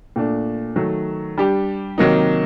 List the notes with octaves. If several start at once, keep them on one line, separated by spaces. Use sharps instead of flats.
A#2 A3 D4
D#3 F#3 A3
G3 D4 G4
C3 D#3 F#3 A#3 D#4